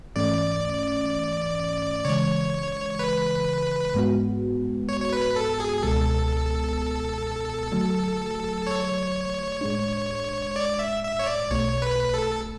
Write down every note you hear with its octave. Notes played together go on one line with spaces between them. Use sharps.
G#2 E3 A3 C#4 D5
C#3 E3 G#3 C#5
B4
G#2 G#3 B3 F#4
C#5
C#5
B4
A4
G#4
C#2 B2 G#3 B3 A4
D3 F#3 A3
C#5
A2 G#3 D4
D5
E5
E5
C#5
D5
B1 B2 A3 C#5
B4
A4